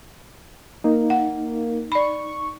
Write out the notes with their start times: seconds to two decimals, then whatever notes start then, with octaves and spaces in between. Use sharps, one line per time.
0.84 A#3 D#4
1.10 F#5
1.92 D5 B5 C#6